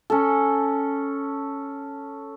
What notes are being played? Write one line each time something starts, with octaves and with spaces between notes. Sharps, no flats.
C#4 A4